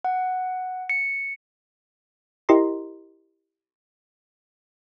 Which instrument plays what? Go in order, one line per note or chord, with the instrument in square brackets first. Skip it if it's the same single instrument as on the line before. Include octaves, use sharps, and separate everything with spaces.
[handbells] F#5
C#7
[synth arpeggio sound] E4 G4 A#4 D#5 A#5 C6